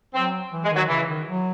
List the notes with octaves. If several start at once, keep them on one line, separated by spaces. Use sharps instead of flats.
F#3 C4
E3
G#3
D#3
F#3
C#3 E3
D#3
F#3